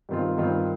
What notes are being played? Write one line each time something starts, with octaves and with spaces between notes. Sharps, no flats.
G2 D#3 G3 C4 F4
G2 D#3 G3 C4 F4